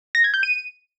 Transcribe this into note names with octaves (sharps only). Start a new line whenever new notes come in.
A#6
G#6
G6
D#7